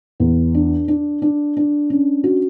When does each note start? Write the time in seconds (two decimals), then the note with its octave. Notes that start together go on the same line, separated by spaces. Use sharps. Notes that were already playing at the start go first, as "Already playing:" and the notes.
0.20 E2
0.54 D4
0.88 D4
1.22 D4
1.57 D4
1.90 C#4
2.24 F#4